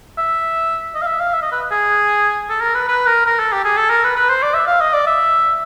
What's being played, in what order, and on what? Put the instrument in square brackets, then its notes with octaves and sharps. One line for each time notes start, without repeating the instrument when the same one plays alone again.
[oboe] E5
D#5
F5
E5
F5
E5
D#5
B4
G#4
A4
A#4
B4
B4
A#4
A#4
A4
G4
G#4
A4
A#4
B4
B4
C5
D5
E5
F5
D#5
D5
E5